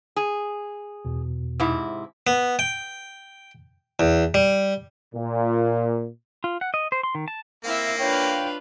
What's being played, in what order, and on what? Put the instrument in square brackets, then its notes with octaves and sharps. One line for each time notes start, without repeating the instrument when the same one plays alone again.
[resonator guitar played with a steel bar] G#4
[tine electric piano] E2 B2
[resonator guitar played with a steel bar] G#2 C3 E4
[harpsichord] B3
G5
E2
G3
[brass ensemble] A#2
[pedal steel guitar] F4
F#5
D#5
C5
C6
D#3
A5
[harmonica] A#3 [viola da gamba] C4 E4 [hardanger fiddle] E5 F5
[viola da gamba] D4 F4 B4 [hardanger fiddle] C#5 F5 [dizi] G5